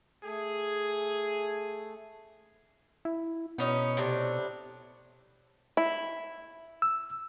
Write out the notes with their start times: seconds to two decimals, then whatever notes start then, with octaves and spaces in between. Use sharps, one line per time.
0.24 A3 G#4 A4
3.05 E4
3.58 B2 B3 C#4 D#4
3.97 A2 C3 D4
5.77 E4
6.82 E6